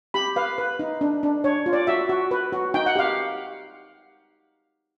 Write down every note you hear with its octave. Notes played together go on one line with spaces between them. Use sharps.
G4 B5
B4 F5
B4
D#4
D4
D4
D4 C#5
F4
D5
F#4 E5
F#4
B4
F#4
D#4 G5
F#5
G4 F5